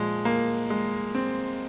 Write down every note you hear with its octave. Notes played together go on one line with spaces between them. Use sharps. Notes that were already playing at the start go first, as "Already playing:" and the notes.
Already playing: A#2 F3 G#3
A#3
G#3
C4